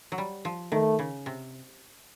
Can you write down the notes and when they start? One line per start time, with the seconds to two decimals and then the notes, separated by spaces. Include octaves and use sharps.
0.12 F#3
0.18 G3
0.45 F3
0.72 D#3 A3
0.99 C#3
1.26 C3